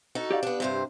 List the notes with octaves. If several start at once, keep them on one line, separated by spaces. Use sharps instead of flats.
D#4 F#4 A4
G4 D5 F5
B3 D4
G2 C3 C5